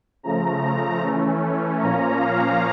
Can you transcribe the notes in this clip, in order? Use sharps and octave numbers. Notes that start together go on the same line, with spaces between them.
C#3 F3 A3 A#5
E3 A3 C#4
A#2 F3 A#3 C#4 A#5
F5